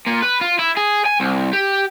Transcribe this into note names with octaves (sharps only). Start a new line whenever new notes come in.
A#2
B4
F4
E4
G#4
G#5
C2
G4